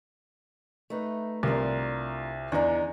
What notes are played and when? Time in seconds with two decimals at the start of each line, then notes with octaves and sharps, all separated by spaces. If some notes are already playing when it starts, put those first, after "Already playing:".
0.90 A3 D#4 B4
1.43 C2 D4 F4 A#4
2.52 E2 D4 D#4 A#5